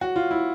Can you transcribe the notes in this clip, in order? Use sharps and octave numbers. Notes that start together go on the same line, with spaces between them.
F#4
F4
E4